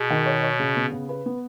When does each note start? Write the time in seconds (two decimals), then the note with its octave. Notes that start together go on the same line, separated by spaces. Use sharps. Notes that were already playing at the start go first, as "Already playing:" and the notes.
Already playing: B2 G#4
0.10 D#3
0.26 C#5
0.43 C#5
0.59 C#3
0.76 B3
0.92 C#3
1.09 B4
1.26 B3